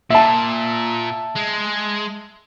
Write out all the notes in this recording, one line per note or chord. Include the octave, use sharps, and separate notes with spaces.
A#2 E5 A5
G#3